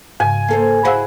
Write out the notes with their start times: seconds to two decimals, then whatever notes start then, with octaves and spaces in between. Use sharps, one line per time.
0.20 G#2 C#3 G#5
0.48 A#3 A4 C5
0.85 E4 F#4 G#4 C5 F5 E6